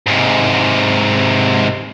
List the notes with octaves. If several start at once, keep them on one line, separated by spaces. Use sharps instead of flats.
G#2 C3